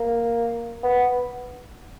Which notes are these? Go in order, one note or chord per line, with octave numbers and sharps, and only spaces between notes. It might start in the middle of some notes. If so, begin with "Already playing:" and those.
Already playing: A#3
B3